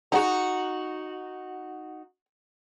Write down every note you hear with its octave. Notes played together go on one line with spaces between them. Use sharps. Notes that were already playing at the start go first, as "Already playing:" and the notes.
D#4 F#4 G#4 F#5 A#5